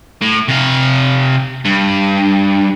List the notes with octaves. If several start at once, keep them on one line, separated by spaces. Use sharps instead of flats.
A2
C3 F5
G2